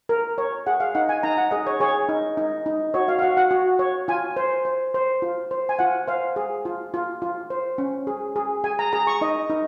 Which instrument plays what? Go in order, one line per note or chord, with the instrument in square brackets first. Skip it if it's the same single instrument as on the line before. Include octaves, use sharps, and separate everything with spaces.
[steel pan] A#4
C#5
G#4 F#5
F5
D#4 F#5
G#5
D#4 A#5
F#5
G#4 D#5
C#5
G#4 C#5
D#4
D#4
D#4
F#4 C#5
F5
F5
F#4 F#5
F#5
F#4
C#5
F4 G#5
C5
C5
C5
F4
C5
G#5
F4 F#5
C5 F5
G#4
F4
F4
F4
C5
C#4
G#4
G#4
G#4 G#5
A#5
G#4 A#5
C#6
D#4 D#5
D#4